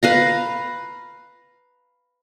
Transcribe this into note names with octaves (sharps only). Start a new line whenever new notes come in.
B4 F5 A#5